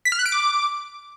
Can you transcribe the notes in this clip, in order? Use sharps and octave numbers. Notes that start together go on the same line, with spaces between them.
B6
F6
F#6
D7
D6